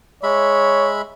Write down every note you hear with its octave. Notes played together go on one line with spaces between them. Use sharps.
G#3 C#5 E5 B5